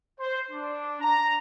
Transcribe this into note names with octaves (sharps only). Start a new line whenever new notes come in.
C5
D4
A#5